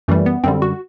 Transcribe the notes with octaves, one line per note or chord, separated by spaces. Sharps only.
F#2 E3 G3 A3
B3
F#2 D3 G3 C4
F#4